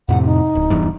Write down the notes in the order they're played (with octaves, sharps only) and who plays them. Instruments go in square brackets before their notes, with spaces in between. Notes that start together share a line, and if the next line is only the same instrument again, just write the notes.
[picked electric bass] F2 A2 C3 [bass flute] F#5
[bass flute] D#4
[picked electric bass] D1
E1 E2 G2